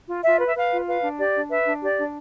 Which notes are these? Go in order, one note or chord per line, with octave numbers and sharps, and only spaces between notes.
F4
F4 E5
B4
E5
B4 F5
F4
B4 F5
D4
G4 D5
D4
B4 E5
D4
G4 D5
D4